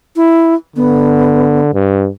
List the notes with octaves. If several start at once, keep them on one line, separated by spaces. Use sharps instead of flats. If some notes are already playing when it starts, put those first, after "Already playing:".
E4
D3 B3
G2